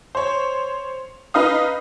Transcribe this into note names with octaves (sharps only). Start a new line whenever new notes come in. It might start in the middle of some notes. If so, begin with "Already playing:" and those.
C5 C#5
D#4 B4 F5 D#6